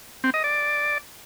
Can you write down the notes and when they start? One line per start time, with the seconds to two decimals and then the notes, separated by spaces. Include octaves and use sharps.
0.24 C4
0.34 D#5
0.44 D5